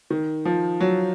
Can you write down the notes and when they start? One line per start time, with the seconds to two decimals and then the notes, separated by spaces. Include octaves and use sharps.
0.10 D#3
0.45 F3
0.80 F#3